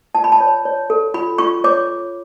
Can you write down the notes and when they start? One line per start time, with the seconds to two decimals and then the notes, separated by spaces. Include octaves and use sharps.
0.15 F4 A5
0.24 B5
0.32 A5
0.40 C#5
0.65 C#5
0.90 A4
1.14 F4 B5
1.38 F4 C#6
1.64 C#5 D6